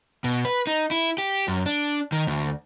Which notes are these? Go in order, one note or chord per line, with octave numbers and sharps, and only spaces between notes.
B2
B4
D#4
E4
G4
F#2
D4
D#3
D2